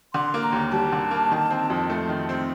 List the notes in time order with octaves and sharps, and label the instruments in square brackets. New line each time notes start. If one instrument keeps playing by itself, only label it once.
[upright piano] D3 [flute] C6
[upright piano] A#3
[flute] A#5
[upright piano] D#2
[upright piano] G3 [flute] A5
[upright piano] D3
A#3
D#3
C4
F2
A3
D#3
C4